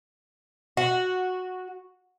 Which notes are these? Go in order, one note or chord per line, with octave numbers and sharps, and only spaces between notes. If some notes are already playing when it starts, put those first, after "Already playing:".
F#4